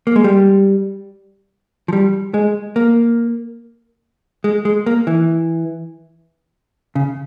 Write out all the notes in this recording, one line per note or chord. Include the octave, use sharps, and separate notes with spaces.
A#3
G#3
G3
F3
G3
G#3
A#3
G#3
G#3
A#3
E3
C#3